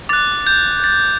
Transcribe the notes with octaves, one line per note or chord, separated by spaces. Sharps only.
D6 F#6 A6
G6
A6